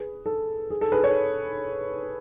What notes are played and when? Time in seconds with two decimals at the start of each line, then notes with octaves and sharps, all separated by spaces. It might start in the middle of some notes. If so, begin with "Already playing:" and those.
Already playing: G#4 B4
0.26 A4
0.70 G#4
0.81 A4
0.92 G#4 B4
1.03 A4 C#5